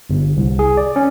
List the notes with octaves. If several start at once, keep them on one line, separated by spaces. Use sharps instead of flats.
G1
C2
G#4
D5
C#4